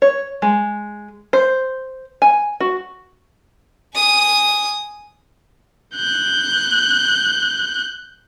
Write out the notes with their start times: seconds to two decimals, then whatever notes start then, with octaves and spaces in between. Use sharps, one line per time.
0.02 C#5
0.42 G#3
1.33 C5
2.22 G#5
2.60 F#4
3.94 G#5 D#6
5.95 F#6 G6